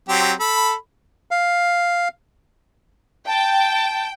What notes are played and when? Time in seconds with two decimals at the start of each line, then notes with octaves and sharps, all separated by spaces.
0.09 F#3 C4 G4
0.40 A4 B5
1.31 F5
3.26 G5 A5